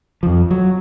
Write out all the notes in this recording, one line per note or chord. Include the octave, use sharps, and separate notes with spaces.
F2 F3
F#3